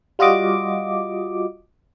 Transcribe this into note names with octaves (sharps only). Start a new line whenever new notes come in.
G3 F4 F#4 D#5 D6